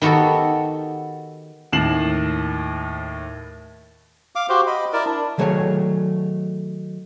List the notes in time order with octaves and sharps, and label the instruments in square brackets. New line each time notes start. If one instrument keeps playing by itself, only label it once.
[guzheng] D#3 B3 F#4 G4 A4
[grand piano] D#2 A2 C7 E7 F#7
[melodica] F5 D6
F#4 G4 C5
D#5 B5
E4 A#4 D5
D4
[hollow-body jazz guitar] D#3 F#3 A3 G#4 C#5